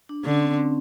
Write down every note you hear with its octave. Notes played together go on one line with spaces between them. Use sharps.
D4
D3 C#4
C4
C4